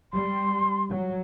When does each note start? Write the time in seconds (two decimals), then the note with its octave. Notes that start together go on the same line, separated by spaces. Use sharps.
0.13 G3 C6
0.91 F#3